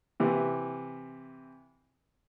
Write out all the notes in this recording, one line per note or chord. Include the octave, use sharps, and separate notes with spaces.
C3 E3